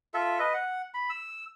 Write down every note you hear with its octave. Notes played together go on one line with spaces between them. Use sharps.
F4 A4 E5
B4 D#5
F#5
B5
E6